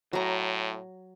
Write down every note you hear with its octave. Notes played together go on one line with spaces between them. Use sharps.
A2 F#3 A#5